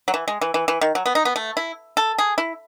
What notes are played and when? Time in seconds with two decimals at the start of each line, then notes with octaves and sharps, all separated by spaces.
0.08 F#3
0.14 E3
0.28 G#3
0.41 E3
0.54 E3
0.68 E3
0.81 D#3
0.95 F#3
1.06 B3
1.15 D#4
1.25 B3
1.36 A3
1.57 E4
1.97 A4
2.18 G#4
2.38 E4